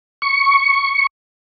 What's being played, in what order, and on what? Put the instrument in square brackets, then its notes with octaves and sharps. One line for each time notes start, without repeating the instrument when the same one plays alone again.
[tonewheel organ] C#6